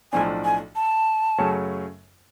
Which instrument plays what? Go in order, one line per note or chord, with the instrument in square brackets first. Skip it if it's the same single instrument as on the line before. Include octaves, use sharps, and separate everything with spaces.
[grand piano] B1 A2 F3 A3 D4 [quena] G#5
[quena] G#5
A5
[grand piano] F#2 C#3 F#3 A3 C#4